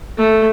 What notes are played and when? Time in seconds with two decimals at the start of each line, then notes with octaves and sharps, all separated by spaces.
0.18 A3